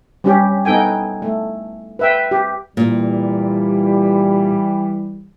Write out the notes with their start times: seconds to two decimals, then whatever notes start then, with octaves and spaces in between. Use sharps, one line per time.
0.24 G3 C#4 G4
0.65 B3 D#4 A4 G5 G#5
1.22 A3
1.99 B4 E5 G5
2.31 G4
2.77 A#2 E3 G3